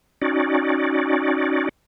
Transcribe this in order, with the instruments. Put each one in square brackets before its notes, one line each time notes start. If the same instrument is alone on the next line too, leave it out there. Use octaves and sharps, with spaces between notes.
[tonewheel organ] C#4 D#4 F#4 D5